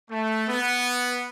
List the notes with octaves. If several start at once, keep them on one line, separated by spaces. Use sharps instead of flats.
A3
B3